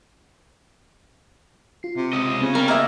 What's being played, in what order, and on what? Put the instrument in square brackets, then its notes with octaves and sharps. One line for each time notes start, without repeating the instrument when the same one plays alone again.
[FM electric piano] F4 C7
[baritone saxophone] C3
[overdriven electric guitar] C#2 D#5
[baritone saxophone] C#3 [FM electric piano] B3 C4
[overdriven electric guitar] G3 [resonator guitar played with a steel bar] A#4
[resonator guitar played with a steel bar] A#3 D#5 E5 [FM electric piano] B5